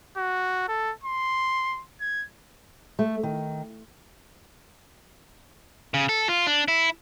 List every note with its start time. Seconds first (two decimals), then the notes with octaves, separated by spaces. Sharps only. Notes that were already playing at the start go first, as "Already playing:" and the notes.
0.17 F#4
0.68 A4
1.03 C6
2.01 G#6
2.99 A3
3.23 D#3
5.94 C#3
6.09 A4
6.29 F4
6.47 D4
6.68 E4